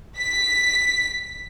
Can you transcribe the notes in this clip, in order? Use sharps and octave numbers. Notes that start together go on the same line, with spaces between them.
B6